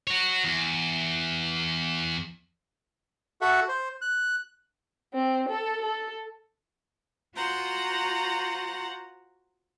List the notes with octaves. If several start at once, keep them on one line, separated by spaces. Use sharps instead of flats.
F#4 C#5
E2
F#4 A4 E5 F#5
C5
F#6
C4
A4
A4
F4 F#4 C5 F#5 A#5